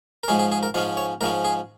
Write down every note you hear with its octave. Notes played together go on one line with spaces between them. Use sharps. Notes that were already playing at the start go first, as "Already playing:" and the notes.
A#4
G#2 F3 G#3 C#4 G#4
G#4
G#4
A#4
G#2 F3 G#3 C#4 F4
C#5
G#2 F3 G#3 C#4 A#4
G#4